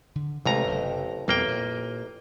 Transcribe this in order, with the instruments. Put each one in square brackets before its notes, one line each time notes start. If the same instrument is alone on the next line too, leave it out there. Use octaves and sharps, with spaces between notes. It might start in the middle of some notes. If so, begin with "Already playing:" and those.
[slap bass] D3
[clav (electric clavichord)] A1 F2 A#5 [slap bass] C3 G#3 A3
[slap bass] F#1 F#2 C3
[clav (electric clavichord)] A1 A#3 G5 [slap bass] F2 B2 G3
[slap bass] A#2